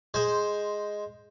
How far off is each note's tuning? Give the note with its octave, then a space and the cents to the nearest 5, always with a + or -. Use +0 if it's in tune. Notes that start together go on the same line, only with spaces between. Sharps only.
G#3 +0 C5 +0